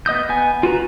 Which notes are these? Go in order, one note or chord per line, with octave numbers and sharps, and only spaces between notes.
B3 D#5 D#6 G6
B3 G#5
F4 F#4 B4 A#5